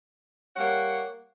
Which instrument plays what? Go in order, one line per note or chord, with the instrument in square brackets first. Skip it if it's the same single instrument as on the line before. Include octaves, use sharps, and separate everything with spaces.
[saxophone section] G3 A#3 C#5 F#5